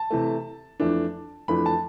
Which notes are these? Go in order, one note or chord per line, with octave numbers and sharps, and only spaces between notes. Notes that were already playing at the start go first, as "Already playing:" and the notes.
Already playing: A5
C3 E3 A3
F2 E3 A3 D4
F2 E3 A3 D4 B5
A5